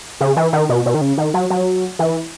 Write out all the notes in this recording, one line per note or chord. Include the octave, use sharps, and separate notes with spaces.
C#3
E3
D#3
B2
B2
D#3
C#3
D#3
F#3
F#3
E3